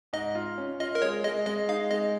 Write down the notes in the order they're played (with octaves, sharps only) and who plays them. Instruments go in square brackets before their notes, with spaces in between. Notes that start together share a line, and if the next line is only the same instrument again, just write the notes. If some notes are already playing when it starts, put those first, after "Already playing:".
[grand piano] G#2 [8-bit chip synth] D#5
[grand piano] F4
C#4
[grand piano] F4 [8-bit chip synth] D#5
[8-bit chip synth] A#4
[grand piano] G#3 [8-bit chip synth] C#5
[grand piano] G#3 [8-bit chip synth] D#5
[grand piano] G#3 [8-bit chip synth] D#5
[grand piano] D#4 [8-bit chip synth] F5
[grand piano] G#3 [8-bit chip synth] D#5